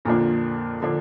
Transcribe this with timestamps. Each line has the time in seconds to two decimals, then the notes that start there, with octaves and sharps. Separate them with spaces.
0.05 F2 A#2 D3 F3 A#3 D4
0.82 D3 F3 D4